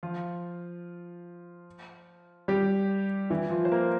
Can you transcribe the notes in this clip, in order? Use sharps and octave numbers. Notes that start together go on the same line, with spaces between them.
F3 F4
G3 G4
E3 E4
F3 F4
C5
A#3 A#4